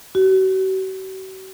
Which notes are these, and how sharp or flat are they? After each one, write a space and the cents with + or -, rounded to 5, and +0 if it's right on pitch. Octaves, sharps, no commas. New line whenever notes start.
F#4 +45